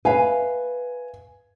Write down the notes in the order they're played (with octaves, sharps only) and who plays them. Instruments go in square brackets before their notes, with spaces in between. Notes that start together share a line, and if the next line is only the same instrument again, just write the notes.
[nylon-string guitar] B4 E5 F5 [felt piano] G#5